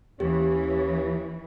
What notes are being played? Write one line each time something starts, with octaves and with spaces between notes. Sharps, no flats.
D#2 E3 C#4 G4